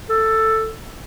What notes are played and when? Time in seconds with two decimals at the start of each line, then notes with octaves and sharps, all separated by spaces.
0.09 A4